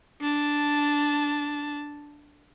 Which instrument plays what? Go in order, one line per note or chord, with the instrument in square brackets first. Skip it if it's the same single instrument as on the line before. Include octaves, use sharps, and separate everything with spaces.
[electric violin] D4 A5